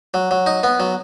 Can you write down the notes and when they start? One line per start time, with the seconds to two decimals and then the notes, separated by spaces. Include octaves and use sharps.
0.14 F#3
0.31 F#3
0.46 D#4
0.63 B3
0.80 F#3